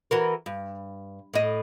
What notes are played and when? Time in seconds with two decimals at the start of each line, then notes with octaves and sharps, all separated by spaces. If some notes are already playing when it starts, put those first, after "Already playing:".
0.11 E3 F#4 A#4
0.46 G2
1.34 A2 D#5